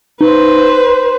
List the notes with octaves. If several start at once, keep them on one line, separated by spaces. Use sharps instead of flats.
D#4 B4 C5